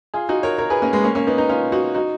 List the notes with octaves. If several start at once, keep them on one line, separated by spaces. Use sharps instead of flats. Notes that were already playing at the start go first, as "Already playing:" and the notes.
F4 G#4
D#4 F#4
A#4 C#5
A#4 C#5
G#4 B4
A#3 C#4
G#3 B3
A#3 C#4
A#3 C#4
B3 D#4
B3 D#4
C#4 F4
D#4 F#4
D#4 F#4